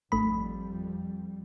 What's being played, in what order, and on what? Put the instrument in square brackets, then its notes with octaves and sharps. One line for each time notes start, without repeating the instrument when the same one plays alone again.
[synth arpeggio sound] G#1 A3 B5 [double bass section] F2 G3